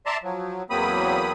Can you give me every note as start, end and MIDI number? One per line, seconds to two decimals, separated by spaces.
0.06 0.17 74
0.06 0.17 76
0.06 0.17 81
0.06 0.17 82
0.06 0.17 84
0.24 0.63 53
0.24 0.63 54
0.70 1.32 40
0.70 1.32 54
0.70 1.32 58
0.70 1.32 60
0.70 1.32 83
0.70 1.32 87